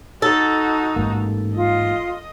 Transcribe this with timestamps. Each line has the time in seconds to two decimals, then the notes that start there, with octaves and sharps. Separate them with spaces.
0.22 D#4 F#4 A4
0.96 A1 G#2 A#3
1.55 F4 D#5